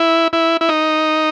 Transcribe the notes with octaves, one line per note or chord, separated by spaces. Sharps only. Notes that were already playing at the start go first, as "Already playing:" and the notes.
Already playing: E4
E4
E4
D#4